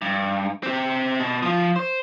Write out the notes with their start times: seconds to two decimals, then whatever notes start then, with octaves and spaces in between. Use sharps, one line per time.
0.02 G2
0.63 C4 G4
1.20 B2
1.43 F3 F4
1.76 C5